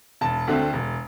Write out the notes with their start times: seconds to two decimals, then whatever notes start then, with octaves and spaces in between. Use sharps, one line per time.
0.21 E1 A5
0.47 D2 D3 A3 C4
0.73 E1